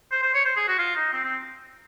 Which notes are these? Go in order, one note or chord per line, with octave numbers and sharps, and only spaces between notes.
C5
C5
C#5
C5
G#4
F#4
F4
D#4
C4
C4